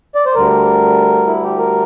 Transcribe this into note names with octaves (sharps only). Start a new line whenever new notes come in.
D5
C5
D2 D3 G3 A#4
E4
G4
A#4